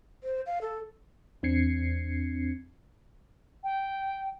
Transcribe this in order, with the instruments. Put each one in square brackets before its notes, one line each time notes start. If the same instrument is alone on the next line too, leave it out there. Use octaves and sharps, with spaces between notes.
[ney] C5
F5
A4
[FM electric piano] E2 C4 D4 G#6 C7 C#7
[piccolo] G5